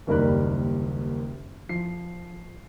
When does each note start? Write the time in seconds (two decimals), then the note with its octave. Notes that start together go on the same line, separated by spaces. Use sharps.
0.07 F#1 D#2 G3 A#4 B5 F#6
1.69 F3 C7